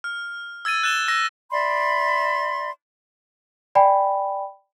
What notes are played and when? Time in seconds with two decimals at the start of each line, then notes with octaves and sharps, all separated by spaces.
0.04 F6
0.65 E6 G#6 A6 D#7
0.83 F#6 A6 E7 G7
1.08 E6 A#6
1.51 D5 E5 B5 C6
3.75 D5 G5 G#5 B5